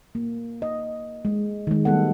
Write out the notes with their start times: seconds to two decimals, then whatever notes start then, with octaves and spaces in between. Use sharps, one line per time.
0.15 A#3
0.62 D#5
1.25 G#3
1.67 D#3 G#3
1.85 F#3 G3 A3 B3 A4 F#5